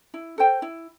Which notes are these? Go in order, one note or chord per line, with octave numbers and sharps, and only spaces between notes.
E4
A4 C5 G5
E4